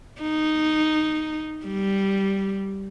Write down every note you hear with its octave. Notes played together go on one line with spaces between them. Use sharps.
D#4
G3